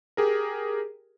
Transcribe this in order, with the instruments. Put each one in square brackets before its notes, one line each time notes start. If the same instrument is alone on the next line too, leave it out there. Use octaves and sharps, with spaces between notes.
[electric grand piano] G4 G#4 A#4